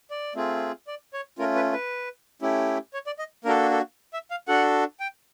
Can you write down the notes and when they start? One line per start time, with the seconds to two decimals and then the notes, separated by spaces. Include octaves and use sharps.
0.10 D5
0.35 A3 C4 F4 G#4
0.87 D5
1.13 C#5
1.38 A3 C#4 F4 A#4
1.55 B4
1.73 B4
2.42 A3 C#4 E4 G4
2.94 C#5
3.06 D5
3.19 D#5
3.45 A#3 D4 F#4 A4 A#4
3.71 A4
4.13 E5
4.31 F5
4.48 D4 F#4 A4 F#5
5.00 G5